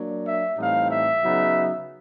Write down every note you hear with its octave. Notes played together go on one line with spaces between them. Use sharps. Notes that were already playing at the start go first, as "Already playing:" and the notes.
Already playing: F#3 A#3 D4
E5
A2 E3 G3 C4 D#4 F5
E5
C#3 F#3 B3 D#4